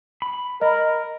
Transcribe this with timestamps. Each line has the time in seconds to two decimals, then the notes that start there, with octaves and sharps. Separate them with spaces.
0.22 B5
0.61 A#4 D#5 A#5